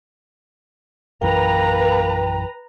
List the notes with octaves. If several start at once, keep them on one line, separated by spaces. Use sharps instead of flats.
A#1 F#2 E3 A#3 B4 G5 A#5